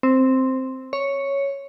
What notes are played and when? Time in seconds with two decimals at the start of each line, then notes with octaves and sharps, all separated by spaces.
0.03 C4
0.93 C#5